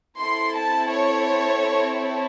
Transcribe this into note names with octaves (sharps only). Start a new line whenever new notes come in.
C4 E4 A4 C6
A5
C#5